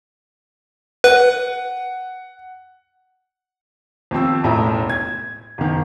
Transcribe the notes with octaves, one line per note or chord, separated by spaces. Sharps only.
B4 F#5
D#2 F3 C4 E6
E1 A1 A2 E4 A#5
G#6
F#1 D#3